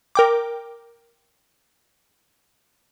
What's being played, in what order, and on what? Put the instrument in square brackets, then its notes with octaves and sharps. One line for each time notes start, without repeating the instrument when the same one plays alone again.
[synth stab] A#4 G5 D6